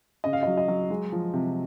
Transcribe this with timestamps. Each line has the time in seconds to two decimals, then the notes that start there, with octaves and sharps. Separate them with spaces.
0.24 C#3 D#5
0.33 F5
0.43 D#5
0.47 F#3
0.57 D#5
0.68 F#3
0.90 G#3
1.12 F3
1.33 C3